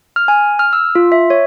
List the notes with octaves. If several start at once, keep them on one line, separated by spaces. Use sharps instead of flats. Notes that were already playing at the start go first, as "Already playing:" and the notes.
F6
G#5
F6
E6
F4
E5
C#5